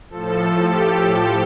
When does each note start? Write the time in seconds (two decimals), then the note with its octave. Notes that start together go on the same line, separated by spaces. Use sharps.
0.10 A2 F3 A4
0.64 G4